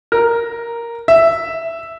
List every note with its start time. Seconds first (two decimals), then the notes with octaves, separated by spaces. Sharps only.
0.12 A#4
1.08 E5